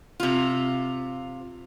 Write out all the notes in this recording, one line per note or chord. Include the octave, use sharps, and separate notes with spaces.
C3 F4